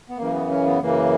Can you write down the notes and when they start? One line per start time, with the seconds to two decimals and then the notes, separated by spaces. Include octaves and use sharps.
0.09 B3
0.18 F#2 C#3 E3 A#3
0.34 B3
0.50 C#4
0.66 B3
0.82 F#2 C#3 E3 A#3